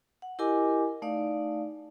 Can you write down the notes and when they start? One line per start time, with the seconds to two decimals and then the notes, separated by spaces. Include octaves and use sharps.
0.22 F#5
0.39 E4 G4 A#4 D#5 G#5 D6
1.02 A3 D#4 D5 F5